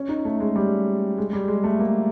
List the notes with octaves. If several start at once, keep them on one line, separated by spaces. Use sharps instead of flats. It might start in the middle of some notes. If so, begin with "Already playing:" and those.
Already playing: C#4
D#4
A3
G#3
G3
G#3
G3
G#3
A3
A#3